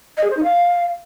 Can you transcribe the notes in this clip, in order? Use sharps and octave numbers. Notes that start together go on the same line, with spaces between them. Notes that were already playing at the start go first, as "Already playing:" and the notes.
D#5
G#4
C5
D#4
F5